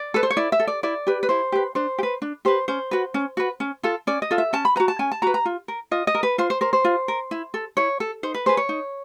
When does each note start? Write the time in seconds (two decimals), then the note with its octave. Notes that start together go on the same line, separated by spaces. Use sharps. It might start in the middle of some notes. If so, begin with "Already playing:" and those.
Already playing: D5
0.14 A4 B4
0.23 C5
0.30 C#5
0.37 E4 D5
0.52 E5
0.60 A4
0.67 D5
0.83 E4 D5
1.07 G4 B4
1.23 B4
1.29 E4 C5
1.52 G4 B4
1.75 D4 C5
1.98 G4
2.03 B4
2.22 D4
2.45 G4 B4 C5
2.68 C#4 C5
2.91 F#4 B4
3.14 C#4
3.37 F#4 B4
3.60 C#4
3.83 F4 A4
4.07 C#4 D5
4.22 D#5
4.31 F4 A4
4.38 E5
4.53 C#4 A5
4.65 B5
4.76 F#4 B4 A#5
4.88 A5
4.99 C#4 G#5
5.12 A5
5.22 F#4 B4 A#5
5.34 A#5
5.45 F4
5.68 A#4
5.91 F4 D#5
6.07 D#5
6.15 A#4
6.23 B4
6.38 F4 C5
6.50 C5
6.61 A#4 C5
6.73 C5
6.85 F4
7.08 A#4
7.31 E4
7.54 A4
7.77 E4 C#5
8.00 A4
8.23 D#4 C5
8.34 B4
8.46 G#4 B4 C5
8.57 C#5
8.69 D#4